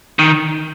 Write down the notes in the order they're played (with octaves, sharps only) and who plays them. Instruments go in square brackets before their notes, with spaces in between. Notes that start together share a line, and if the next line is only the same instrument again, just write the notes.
[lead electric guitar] D#3